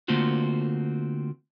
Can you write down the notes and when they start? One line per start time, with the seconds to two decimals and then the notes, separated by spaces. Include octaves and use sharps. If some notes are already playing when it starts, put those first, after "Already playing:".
0.08 D3 A3 A#3 C4 F4 F#4